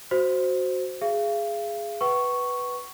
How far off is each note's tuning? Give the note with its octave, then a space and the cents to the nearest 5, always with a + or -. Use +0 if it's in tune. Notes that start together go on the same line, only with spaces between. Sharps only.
F#4 +0 C5 +0
G#4 +0 F5 -40
B4 +0 F#5 +45 C#6 +0